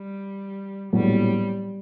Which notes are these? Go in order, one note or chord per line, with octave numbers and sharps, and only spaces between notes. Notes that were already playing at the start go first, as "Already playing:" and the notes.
Already playing: G3
A#1 A2 F#3 G3 B3